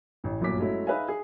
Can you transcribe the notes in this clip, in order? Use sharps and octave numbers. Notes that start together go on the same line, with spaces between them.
A1 E3
G1 F#2 A#2 F#3 D6 B6
F#3 G#3 A3 C#4 E4
D#4 G#4 B4 E5 F5 G#5
G#4